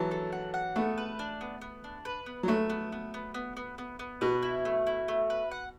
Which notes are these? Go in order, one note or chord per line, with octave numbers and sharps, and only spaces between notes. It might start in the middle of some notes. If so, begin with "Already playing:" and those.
Already playing: E3 F#3 A5
A4
F#5
F#5
A3 B3
B4
D4
B3
B3
D4
B4
B3
F#3
A3 B3
B3
B3
B3
B3
B3
B3
B3
B2 B4
E4
A3
E4
A3
B4
F#5